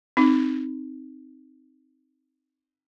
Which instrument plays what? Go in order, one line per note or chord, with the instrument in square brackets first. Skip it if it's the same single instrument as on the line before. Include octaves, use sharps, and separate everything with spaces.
[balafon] C4 D#4